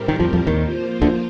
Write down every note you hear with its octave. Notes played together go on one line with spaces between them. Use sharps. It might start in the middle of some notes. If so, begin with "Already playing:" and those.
Already playing: A2 G3 C4 G4 A#4
D#3
F2 F3
F2 F3
D#2 D#3
F3 A#3 F4 C5
D2 D3